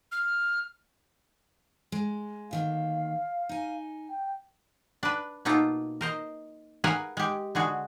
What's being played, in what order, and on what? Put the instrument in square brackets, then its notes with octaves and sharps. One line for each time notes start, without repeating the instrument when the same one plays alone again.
[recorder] F6
[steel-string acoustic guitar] G#3
[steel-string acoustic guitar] D2 D#3 A#3 [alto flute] F5
[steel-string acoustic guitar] D#4 G#5
[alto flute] G5
[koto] D4 B4
B2 A#3 D#4 F4 A4
A#4 C5 D#5
G#4 A#4 B4 F5 F#5 G#5
G#3 G4
D3 G#3 F#4 G#4